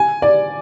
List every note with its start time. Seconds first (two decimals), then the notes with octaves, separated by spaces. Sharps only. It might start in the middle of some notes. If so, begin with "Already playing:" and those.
Already playing: G#5
0.22 D5